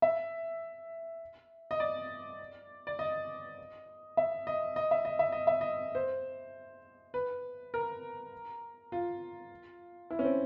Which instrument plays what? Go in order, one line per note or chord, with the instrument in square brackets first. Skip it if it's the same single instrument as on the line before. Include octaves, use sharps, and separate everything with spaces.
[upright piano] E5
D#5
D5
D5
D#5
E5
D#5
D#5
E5
D#5
E5
D#5
E5
D#5
C5
B4
A#4
F4
E4
C#4
C4